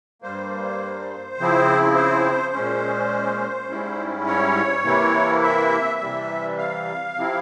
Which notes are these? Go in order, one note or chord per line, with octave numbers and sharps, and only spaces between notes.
G2 G3 A#3 C5
C#3 F3 C4 E4
C5
A#2 G#3 C#4
G#2 G3 C#4 E4
C#5
C3 E3 A#3 E4
E5
C3 E3 G3
F5
C3 F3 C4 E4